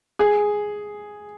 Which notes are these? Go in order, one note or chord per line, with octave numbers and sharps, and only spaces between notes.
G#4